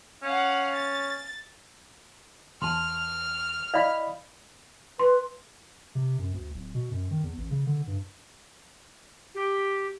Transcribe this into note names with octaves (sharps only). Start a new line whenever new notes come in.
C#4 F5 F#5
A6
E2 A5 C6 F6
E4 D5 D#5 F5 B5
B4 C6
C3
F#2
D2
D1
B2
F#2
D#3
E2
A1
C#3
D3
G2
G4